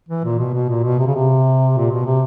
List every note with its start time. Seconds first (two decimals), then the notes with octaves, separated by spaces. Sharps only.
0.09 E3
0.24 A#2
0.39 B2
0.54 B2
0.69 A#2
0.84 B2
0.99 C3
1.07 C#3
1.15 C3
1.77 A#2
1.91 B2
2.05 C3